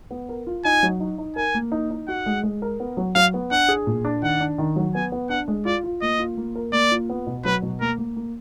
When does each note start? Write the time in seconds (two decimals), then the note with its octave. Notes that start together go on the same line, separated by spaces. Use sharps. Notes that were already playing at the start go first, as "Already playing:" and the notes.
0.11 B3
0.29 A#4
0.47 F4
0.64 D#4 G#5
0.83 F#3
1.00 D#4
1.18 D#4
1.36 A#4 G#5
1.54 A#3
1.72 D#4
1.91 D#4
2.08 F#4 F#5
2.26 G#3
2.43 G#3
2.62 A#4
2.80 B3
2.97 F#3
3.15 F#3 F5
3.34 B3
3.51 D4 F#5
3.69 G#4
3.87 A#2
4.05 D4
4.22 D#3 F#5
4.40 D4
4.58 D#3
4.76 F#3
4.95 B3 G#5
5.12 B3
5.30 D4 F#5
5.48 G#3
5.65 F4 D5
5.84 F4
6.01 A#3 D#5
6.20 F4
6.37 A#3
6.55 A#4
6.73 A#3 D5
6.91 F4
7.10 B3
7.27 B2
7.45 F#3 B4
7.62 B2
7.81 A#3 A#4
7.98 A#3
8.16 A#3